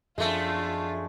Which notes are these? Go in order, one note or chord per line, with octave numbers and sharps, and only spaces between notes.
F#2 F3 G#3 A3 D4 F4